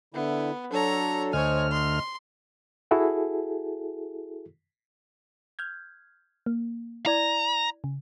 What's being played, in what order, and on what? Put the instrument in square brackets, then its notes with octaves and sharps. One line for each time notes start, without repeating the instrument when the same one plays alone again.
[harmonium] D3 E4 [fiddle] B3
[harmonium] F#3 D4 A4 [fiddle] C#5 A#5
[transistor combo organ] D2 F6 [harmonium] C5 D#5 [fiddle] C#5 G#5
[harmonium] D#5 [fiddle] C6
[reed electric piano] E4 F#4 G#4 A4
[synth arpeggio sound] F6 G6 G#6
A#3
[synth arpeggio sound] E4 D5 G#6 [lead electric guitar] A#5
[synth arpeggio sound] C#3